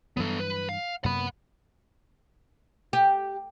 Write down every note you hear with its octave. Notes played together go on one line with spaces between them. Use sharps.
G2 E3 F#3 B3 A4
B4
F5
F#2 C3 A#3 F#5 B5
G4